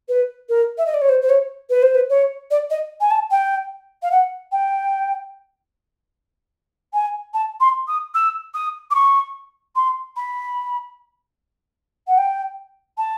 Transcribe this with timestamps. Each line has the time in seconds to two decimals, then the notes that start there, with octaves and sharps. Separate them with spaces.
0.08 B4
0.49 A#4
0.77 E5
0.86 D#5
0.94 D5
1.01 C#5
1.09 C5
1.21 C5
1.29 C#5
1.69 B4
1.82 C5
1.94 B4
2.09 C#5
2.50 D5
2.70 D#5
3.00 G#5
3.10 A5
3.31 G5
4.02 F5
4.11 F#5
4.52 G5
6.93 G#5
7.33 A5
7.60 C6
7.87 D#6
8.14 E6
8.54 D#6
8.90 D6
8.94 C#6
9.75 C6
10.16 B5
12.07 F#5
12.17 G5
12.97 A5